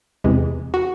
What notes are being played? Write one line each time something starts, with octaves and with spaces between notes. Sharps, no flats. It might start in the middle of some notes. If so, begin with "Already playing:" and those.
E2 C3 E3 G#3
F#4